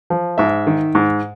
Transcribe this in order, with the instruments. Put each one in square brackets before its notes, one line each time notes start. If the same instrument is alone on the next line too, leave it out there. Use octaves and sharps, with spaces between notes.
[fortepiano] F3
G#2 E5
D#3
G#2